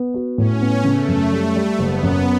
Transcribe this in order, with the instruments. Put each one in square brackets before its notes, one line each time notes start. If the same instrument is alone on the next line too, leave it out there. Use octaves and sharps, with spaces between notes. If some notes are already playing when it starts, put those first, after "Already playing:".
Already playing: [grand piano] B3
F#4
[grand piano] A2 [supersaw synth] C#4
[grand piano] B3
[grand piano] C#3 [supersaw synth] A3
[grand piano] F#2
G3
G3
[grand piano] F#1 [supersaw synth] B3
[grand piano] F#2